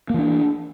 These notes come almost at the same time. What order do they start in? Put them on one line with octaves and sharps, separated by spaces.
A#3 E3 D4